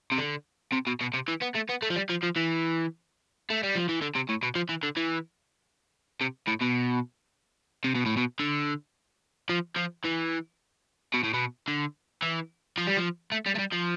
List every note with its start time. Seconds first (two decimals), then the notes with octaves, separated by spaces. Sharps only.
0.12 C3
0.18 D3
0.72 C3
0.87 B2
1.01 B2
1.14 C3
1.28 E3
1.41 B3
1.55 A3
1.69 B3
1.82 A3
1.90 F3
1.96 G3
2.10 F3
2.23 F3
2.36 E3
3.50 A3
3.63 G3
3.75 F3
3.89 E3
4.01 D3
4.15 C3
4.29 A2
4.43 B2
4.55 F3
4.69 E3
4.83 D3
4.97 E3
6.21 C3
6.47 A2
6.61 B2
7.84 C3
7.95 B2
8.06 A2
8.17 B2
8.39 D3
9.49 F3
9.76 F3
10.04 E3
11.14 B2
11.24 A2
11.34 B2
11.68 D3
12.22 E3
12.78 F3
12.87 G3
12.97 F3
13.32 A3
13.46 G3
13.56 A3
13.59 G3
13.73 F3